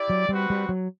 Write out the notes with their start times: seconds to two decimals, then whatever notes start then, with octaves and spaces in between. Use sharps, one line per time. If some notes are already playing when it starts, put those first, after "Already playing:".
Already playing: E4 G4 D5
0.10 F#3
0.29 G3 C4 F#4 B4
0.50 G3
0.69 F#3